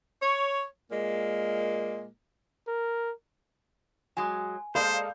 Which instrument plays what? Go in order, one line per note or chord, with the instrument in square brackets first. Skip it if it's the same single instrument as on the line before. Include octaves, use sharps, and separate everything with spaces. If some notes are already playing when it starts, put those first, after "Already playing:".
[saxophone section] C#5
A#2 G#3 A#3
[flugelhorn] A#4
[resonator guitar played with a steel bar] F#3 G#3 [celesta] G#5
[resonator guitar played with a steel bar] G#3 A#3 A4 [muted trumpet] C5 [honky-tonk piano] D5 F5 G6 [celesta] B5